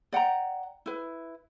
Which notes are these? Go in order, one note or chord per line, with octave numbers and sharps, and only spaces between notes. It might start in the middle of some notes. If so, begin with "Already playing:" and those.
D5 F#5 G5 A#5
E4 B4